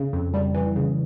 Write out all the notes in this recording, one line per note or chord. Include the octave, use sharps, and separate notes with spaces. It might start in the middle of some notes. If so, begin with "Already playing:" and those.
Already playing: C#3
F2
G3
E3
C#3